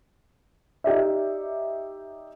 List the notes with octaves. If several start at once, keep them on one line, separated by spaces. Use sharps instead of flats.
D#4 G4 D5 E5